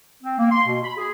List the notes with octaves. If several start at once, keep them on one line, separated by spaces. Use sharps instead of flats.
C4
A#3
C6
B2
B5
G#4